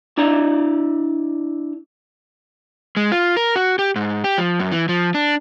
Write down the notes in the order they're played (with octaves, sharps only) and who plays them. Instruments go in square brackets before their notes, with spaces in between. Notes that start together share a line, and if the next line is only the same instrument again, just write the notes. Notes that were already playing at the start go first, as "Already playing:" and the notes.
[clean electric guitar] D4 E4 D5 A#5
[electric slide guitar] G#3
F4
A#4
F#4
G4
G#2
G4
F3
F#2
E3
F3
D4